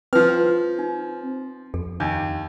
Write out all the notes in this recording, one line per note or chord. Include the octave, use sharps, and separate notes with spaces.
F3 C4 B4 F6
D#4
F2 A4
D#2 G#5